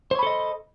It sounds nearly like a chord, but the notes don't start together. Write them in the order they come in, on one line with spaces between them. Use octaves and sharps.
C5 C#5 B5 A4 D#5